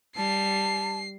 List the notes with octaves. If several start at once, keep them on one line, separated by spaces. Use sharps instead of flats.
G3 A5 C7